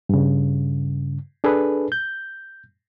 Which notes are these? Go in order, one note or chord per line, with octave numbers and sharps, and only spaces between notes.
G2 C#3
D4 G#4 A4 B4
G6